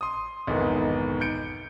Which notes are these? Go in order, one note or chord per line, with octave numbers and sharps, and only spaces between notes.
C6 D#6
B1 F2 G#2 D#3 E3 B3
G6 C#7 D7